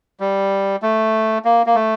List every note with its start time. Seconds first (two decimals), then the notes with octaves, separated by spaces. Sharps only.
0.20 G3
0.82 A3
1.45 A#3
1.66 A#3
1.75 A3